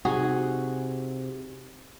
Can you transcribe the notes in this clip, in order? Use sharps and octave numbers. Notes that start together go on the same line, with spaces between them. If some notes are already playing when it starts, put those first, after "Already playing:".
C3 D#4 F#4 G#4